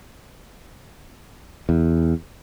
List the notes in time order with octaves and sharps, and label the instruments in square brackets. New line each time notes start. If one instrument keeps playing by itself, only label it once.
[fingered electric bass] E2